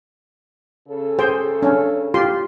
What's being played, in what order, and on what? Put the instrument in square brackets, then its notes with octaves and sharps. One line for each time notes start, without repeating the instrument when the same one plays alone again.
[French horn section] C#3 A4
[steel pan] G#4 C5 G5
C#4 D4
F4 G4 C6